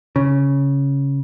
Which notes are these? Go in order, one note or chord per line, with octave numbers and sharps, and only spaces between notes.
C#3